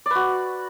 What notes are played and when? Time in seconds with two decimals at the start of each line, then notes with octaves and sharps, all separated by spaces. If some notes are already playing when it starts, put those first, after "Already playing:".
0.06 D5
0.10 B4
0.15 F#4